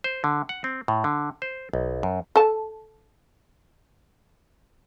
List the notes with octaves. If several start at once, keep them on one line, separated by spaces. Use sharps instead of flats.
C5
D3
F#5
C4
A2
D3
C5
B1
F#2
A4 A5